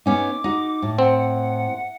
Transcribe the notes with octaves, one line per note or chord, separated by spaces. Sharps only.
B3 C#4 D#4 D6
D#4 F#4
A2
C4 F#5